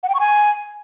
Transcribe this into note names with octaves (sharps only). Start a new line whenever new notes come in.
F#5
G5
C#6
G#5